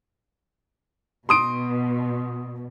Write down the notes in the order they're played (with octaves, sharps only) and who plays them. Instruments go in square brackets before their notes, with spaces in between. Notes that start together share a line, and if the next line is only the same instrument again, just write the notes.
[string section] B2 [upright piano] C6 D#6 D7